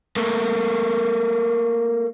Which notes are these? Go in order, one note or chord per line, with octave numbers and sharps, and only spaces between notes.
A3 A#3